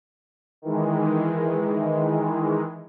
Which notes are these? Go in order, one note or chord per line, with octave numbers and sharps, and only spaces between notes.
D#3 E3 G#3